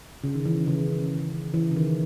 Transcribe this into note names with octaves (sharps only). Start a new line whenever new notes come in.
C#3
D#3
E3
C#3
E3
C#3
D#3